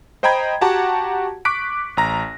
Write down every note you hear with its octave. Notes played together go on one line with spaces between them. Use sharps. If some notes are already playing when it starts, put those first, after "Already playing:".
C5 D#5 G5 A#5 B5 G#6
F#4 G4 F#5 A5 A#5
C#6 D6 F#6 B6 D7
A1 A#5 A#6